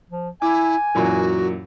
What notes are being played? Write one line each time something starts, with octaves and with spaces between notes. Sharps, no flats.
F3
E4 G#5 D6
F#2 A#2 E3 F#4